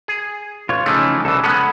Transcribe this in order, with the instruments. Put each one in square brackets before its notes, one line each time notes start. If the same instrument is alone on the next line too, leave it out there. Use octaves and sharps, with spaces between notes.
[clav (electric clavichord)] G#4
[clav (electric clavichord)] A1 [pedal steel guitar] F4 C#5
[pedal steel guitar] C#3 D#4 G#4 [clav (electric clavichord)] E3 F3 A3
[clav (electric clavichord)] C2 E3 [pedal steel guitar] A4
[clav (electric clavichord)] G#3 B3 C#4 [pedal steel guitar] A4 F#5 B5